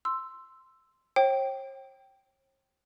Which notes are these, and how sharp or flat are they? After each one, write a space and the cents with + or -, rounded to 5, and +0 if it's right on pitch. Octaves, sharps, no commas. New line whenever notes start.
C6 +0 E6 +10
C#5 -45 G5 -10